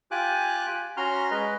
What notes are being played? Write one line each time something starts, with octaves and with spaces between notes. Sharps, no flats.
F4 G4 G#5 D6 F#6
C#4 F#4 A#5 C6 F6
G#3 B4 D#5